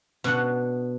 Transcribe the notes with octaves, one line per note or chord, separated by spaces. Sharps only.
B2 D4 F#5